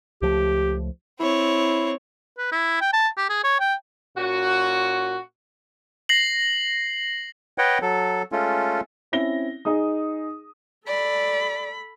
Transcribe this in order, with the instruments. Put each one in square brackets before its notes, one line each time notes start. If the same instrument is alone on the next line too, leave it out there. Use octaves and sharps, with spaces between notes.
[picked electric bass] C#2 F3 A3 [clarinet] G4
[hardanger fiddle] C4 C#5 [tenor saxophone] E4
[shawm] B4
E4
G5
A5
G4
G#4
C#5
G5
[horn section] A#2 C#4 F#4
[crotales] A#6 C7 F#7
[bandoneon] B4 C#5 D#5 F#5 G5
F#3 A4
G#3 A3 C#4 F4 A4
[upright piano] C4 C#4 E4 A#6 G7
D#4 G#4 D#6
[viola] A4 B5 [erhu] D5